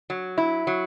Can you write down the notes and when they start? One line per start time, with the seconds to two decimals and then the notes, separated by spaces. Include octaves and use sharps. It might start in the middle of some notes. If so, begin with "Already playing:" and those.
0.10 F#3
0.38 E4
0.67 F#3